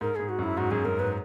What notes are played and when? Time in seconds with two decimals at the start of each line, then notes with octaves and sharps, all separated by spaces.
0.01 G#2 A#4
0.16 G#2 G#4
0.29 F#4
0.39 F#2
0.44 E4
0.57 G#2 F#4
0.71 F#2 G#4
0.85 F#2 A#4
0.99 G#2 B4